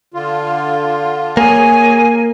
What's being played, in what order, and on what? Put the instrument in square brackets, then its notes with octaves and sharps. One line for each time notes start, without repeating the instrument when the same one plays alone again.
[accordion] D3 F4
[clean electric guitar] A#3 [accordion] G#4 C#5 [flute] G#5